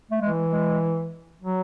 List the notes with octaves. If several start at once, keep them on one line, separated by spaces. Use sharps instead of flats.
A3
E3 G#3
G#3
F#3